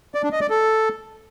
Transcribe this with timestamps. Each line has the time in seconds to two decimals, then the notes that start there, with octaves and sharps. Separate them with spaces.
0.14 D5
0.23 D4
0.32 D#5
0.41 D5
0.50 A4